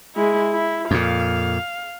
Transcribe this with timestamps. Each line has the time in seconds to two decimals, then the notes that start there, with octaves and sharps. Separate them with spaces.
0.16 G#3 E4
0.53 E4
0.91 F2 A#2 F5